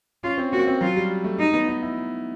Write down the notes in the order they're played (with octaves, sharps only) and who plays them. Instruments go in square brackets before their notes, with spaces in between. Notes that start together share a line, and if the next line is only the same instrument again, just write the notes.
[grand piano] C#4 [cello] F4
[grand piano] C4
[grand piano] A#3 [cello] F#4
[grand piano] C4
[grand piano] F#3 [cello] F4
[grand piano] G3
A3
[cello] D#4
[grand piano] B3
D#4
E4